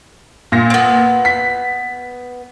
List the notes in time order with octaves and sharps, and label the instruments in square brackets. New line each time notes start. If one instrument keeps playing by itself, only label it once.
[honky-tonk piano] A#2 A#6
[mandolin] B3 C4
[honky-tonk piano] B6